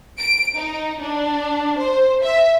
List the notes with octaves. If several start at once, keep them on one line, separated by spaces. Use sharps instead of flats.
D7
D#4
D4
C5
E5